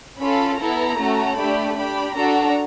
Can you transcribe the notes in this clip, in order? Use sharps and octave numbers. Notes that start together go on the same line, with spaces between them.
C#4 F4 A4 B5
B3 E4 A4 A#5
A3 C#4 F#4 A4
A3 D4 G4 B5
D4 G4 B5
D4 F#4 A4 A#5